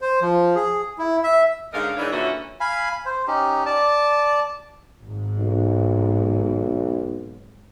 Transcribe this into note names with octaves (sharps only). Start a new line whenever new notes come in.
C5
F3
G#4
E4
E5
G#2 D3 C#4 A#4 D#5 F5
G#2 D#3 E3 G#3 D4 C#5
A#2 D3 E3 C#4 F#4 E5
F5 G#5 B5
C5
C#4 D#4 G4
D5 A5
G#1 G#2
B1